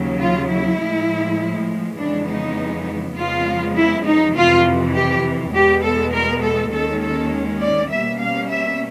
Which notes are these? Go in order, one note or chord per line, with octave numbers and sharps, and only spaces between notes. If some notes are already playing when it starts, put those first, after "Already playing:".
Already playing: D#2 C#3 F#3
F4
E4
A2 F3 G#3
F2 C#3 E3 G#3 B3 D4
D#4
F2 C#3 F3 G#3 B3 F4
E4
D#4
F2 C3 E3 F4
G4
E2 B2 G#3 B3 G4
A4
A#4
A4
D#2 D#3 G#3 C#4 A4
A4
D5
B2 G3 A#3 C#4 E5
F5
E5